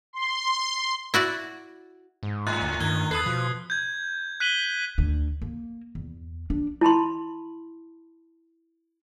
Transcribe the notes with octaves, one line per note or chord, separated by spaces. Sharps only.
C6
E4 F#4 D5
G#2
A2 F#6
D2
G2 D#3 F#6 G#6 G7
E2 A4 B4 D#6 G#6 C7
B2 F3
G6 G#6
F#6 B6 D#7 F#7 G7
D2 D3
A#3
E2
D4
E4 A5 B5 C6